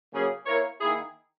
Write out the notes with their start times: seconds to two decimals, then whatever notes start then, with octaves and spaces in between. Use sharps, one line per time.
0.13 C#3 F#3 A#3 C#4 G#4
0.46 A#3 E4 A#4 C#5
0.80 D#3 A#3 E4 G#4